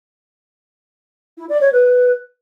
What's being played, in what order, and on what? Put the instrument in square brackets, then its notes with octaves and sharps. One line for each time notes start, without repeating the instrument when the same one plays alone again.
[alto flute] E4
D5
C#5
B4